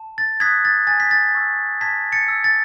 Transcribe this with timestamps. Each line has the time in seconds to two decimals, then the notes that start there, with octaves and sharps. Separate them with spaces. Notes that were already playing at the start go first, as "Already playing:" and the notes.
Already playing: A5
0.18 A6
0.40 D#6 F#6 G#6 B6
0.65 A6
0.87 G#5 A6
1.00 B6
1.11 A6
1.35 C#6 E6
1.81 A5 G#6 B6
2.12 A6 C#7
2.28 E6
2.44 A6